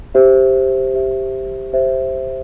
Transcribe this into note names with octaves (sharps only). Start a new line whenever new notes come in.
G4 C5 E5
G4 C5 E5
G4 C5 E5